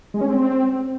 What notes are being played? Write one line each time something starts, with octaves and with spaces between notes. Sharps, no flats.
G#3
C#4
C4